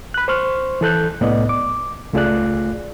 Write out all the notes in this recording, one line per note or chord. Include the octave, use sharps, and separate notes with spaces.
B5 F#6
C5 C6 C#6 F6
E3 A4 F#6 G6
C2 A2 B3 D5 D#5
D6
C#2 A3 F4 G#4 D5 F#6